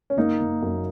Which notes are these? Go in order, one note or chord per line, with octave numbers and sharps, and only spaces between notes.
C#4
F#1 A#3 D#4
F#1
F#2